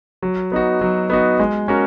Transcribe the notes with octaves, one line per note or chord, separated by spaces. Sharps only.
F#3
B3 D#4 F#4
F#3
B3 D#4 F#4
G#3
C#4 F#4 A#4